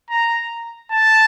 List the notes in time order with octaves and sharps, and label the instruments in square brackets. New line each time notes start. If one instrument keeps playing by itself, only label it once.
[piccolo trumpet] A#5
A5